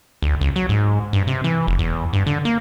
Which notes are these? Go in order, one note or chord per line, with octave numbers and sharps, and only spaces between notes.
D2
C#2
F#3
G#2
G2
C3
E3
F1
E2
G2
D3
A#3